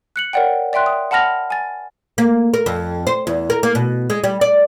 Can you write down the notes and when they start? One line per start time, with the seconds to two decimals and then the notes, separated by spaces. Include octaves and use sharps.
0.16 F#6 C#7 F#7
0.33 A#4 C#5 D5 F#5 G5
0.73 D5 E5 G5 C6 F#6
0.86 D#6
1.11 F#5 A5 B5 F6 A#6 F7
1.50 G#5 A6
2.18 A#3
2.54 A#4
2.66 F2
3.07 C5
3.27 E2
3.50 A#4
3.63 A#3
3.75 B2
4.10 G#3
4.24 G3
4.41 D5